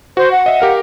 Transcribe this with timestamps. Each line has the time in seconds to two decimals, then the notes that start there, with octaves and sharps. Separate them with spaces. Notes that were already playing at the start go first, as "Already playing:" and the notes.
0.17 F#4 C5
0.31 F#5
0.46 D#5 E5
0.60 G4 A#4 F5